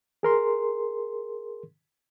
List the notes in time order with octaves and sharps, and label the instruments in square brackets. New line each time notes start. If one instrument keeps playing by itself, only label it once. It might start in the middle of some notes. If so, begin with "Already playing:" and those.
[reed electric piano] G#4 A#4 C6